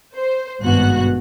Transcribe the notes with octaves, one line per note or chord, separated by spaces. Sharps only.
C5
G#1 G2 B2 F#4 F#6